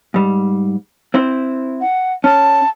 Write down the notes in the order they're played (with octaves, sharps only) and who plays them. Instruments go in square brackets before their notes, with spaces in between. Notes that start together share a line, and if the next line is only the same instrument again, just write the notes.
[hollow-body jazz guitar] G#2 G3
C4 E4 C5
[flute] F#5
[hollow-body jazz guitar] C#4 [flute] A5